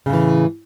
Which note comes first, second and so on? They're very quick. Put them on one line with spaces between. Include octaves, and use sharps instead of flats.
C#3 A2 E3